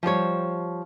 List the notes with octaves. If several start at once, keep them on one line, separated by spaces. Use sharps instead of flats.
F3 G3 C5 C#5